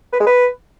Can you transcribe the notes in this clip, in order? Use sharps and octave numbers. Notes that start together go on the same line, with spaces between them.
B4
G#3
B4